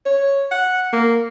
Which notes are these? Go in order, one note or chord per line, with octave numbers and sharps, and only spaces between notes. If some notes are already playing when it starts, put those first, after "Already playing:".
C#5
F#5
A#3